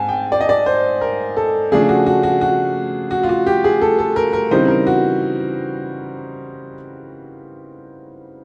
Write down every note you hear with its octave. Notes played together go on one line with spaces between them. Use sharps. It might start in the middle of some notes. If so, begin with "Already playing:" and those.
Already playing: G#2 G#5 A5
G5
D5
D#5
D5
C5
A#4
A4
C#3 F3 A3 D4 G#4
F#4
F#4
F#4
F#4
F#4
F4
F#4
G4
G#4
A4
A4
A#4
A#4
C#3 E3 G3 C4 D#4 C5
A#4
F#4